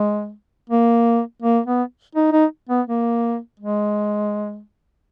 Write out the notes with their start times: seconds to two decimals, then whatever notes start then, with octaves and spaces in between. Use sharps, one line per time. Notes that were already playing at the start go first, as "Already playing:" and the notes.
Already playing: G#3
0.70 A#3
1.42 A#3
1.66 B3
2.15 D#4
2.32 D#4
2.69 B3
2.87 A#3
3.59 G#3